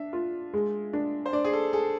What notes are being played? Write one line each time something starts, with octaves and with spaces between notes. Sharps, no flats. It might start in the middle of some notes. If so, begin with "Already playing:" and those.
Already playing: D4 E5
F4
G#3
D4
C5
D4 D5
G#4
A4
G#4 A4